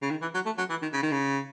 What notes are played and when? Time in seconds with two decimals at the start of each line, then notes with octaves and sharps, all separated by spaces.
0.02 C#3
0.10 D#3
0.22 E3
0.34 F#3
0.45 A3
0.58 F#3
0.70 E3
0.82 D#3
0.93 C#3
1.03 D#3
1.12 C#3